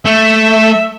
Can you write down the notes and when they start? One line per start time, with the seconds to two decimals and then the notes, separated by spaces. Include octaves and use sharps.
0.06 A3 E5